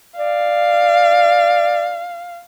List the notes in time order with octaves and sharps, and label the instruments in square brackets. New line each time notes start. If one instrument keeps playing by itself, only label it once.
[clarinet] D5 [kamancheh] F5